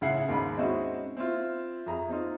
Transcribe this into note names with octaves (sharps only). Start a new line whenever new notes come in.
A1 C#3 E4 F#5 C7
D#2 G#2 G#3 B5
G#3 C4 C#4 D#4 E4 F#4
C4 E4 F4
F2 G#4 E5 A#5
C4 D#4 F4